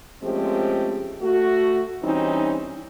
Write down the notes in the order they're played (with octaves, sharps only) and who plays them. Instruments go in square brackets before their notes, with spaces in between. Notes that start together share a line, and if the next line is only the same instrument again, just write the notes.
[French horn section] F3 G#3 A3 C4 C#4 G4
A3 F#4
E3 G3 C4 C#4 D#4